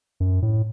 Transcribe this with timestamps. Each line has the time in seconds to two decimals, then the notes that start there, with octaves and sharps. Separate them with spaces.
0.20 F#2
0.42 A2